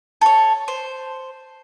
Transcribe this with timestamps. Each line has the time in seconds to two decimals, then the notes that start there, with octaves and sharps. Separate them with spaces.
0.21 A4 C#5
0.68 C5